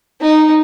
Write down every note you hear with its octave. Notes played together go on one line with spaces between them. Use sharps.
D#4